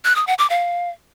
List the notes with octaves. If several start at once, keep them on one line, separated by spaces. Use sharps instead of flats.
F#6
D#6
F#5
D6
F5